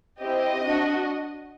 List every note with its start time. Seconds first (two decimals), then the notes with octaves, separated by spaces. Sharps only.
0.21 C4 E4 G4 D#5
0.63 D4 F#4